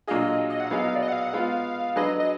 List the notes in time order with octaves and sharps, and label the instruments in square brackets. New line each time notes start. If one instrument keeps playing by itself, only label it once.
[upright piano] A#2 F#3 D4 F4 G#4 [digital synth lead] D#5
[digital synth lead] D#5
F#5
[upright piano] F#3 B3 D#4 G#4 [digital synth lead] F5
[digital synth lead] D5
D#5
F#5
F5
F#5
[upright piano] G#3 B3 F4 [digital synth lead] F5
[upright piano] F#3 D4 G#4 B4 [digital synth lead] D#5
[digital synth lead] D#5